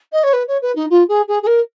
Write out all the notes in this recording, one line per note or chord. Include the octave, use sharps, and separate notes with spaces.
D#5
C#5
B4
C#5
B4
D#4
F4
G#4
G#4
G#4
A#4